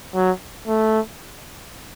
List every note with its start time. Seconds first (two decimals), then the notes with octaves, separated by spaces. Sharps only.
0.15 F#3
0.68 A3